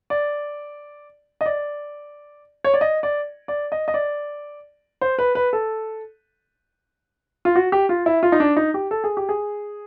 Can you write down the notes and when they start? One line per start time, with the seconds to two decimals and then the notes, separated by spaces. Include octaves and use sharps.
0.10 D5
1.41 D#5
1.46 D5
2.64 C#5
2.74 D5
2.81 D#5
3.03 D5
3.48 D5
3.72 D#5
3.88 D#5
3.94 D5
5.01 C5
5.18 B4
5.35 B4
5.53 A4
7.45 F4
7.56 F#4
7.72 G4
7.89 F4
8.06 E4
8.23 F4
8.32 D#4
8.40 D4
8.57 D#4
8.74 G4
8.91 A4
9.04 G#4
9.17 G4
9.29 G#4